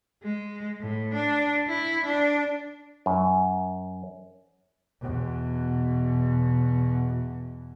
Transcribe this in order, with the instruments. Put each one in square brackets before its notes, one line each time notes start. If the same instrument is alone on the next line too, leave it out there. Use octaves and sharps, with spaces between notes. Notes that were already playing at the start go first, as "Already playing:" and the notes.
[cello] G#3
A2
D4
E4
D4
[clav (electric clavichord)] F#2
[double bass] E2 B2